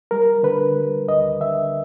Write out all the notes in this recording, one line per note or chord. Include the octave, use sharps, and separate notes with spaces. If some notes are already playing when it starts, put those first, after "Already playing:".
G3 A#4
D3 B4
G3
D2 D#5
D3 E5